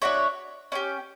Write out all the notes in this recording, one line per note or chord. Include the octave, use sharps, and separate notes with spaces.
D4 F#4 C#5 E5
C#4 E4 G4